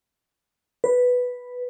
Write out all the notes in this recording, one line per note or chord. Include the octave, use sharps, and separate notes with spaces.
B4